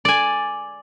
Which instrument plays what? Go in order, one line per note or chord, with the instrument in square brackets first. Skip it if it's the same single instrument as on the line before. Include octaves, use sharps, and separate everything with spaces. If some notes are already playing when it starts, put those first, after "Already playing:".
[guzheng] D5 G#5